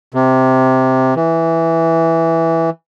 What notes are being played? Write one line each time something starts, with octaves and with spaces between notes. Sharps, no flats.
C3
E3